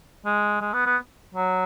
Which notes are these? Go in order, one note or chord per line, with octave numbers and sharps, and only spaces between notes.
G#3
G#3
B3
B3
F#3